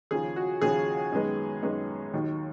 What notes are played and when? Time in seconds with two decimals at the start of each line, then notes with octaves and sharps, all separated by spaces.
0.11 D#2 C#3 F3 G#4
0.36 F#4
0.61 D#2 C#3 F3 G#4
1.12 F#2 D#3 G#3 B3
1.62 F#2 D#3 G#3 B3
2.13 D#2 D#3 F#3